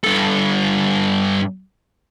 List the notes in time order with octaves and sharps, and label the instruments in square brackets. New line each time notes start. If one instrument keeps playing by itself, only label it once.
[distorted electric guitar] G2 A4